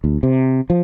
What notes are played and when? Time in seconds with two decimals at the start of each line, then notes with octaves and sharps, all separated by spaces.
0.04 D2
0.23 C3
0.70 F3